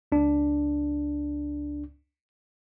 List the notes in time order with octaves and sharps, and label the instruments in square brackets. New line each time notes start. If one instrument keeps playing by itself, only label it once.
[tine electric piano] C#2 D4